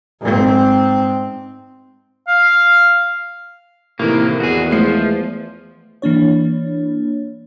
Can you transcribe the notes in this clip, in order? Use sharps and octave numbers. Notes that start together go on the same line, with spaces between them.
G#2 C4
F5
A2 C3 D#3 E3 A#3
E2 F#4 G#4
F3 G#3 A3 F4 C7
E3 A#3 D4 C#5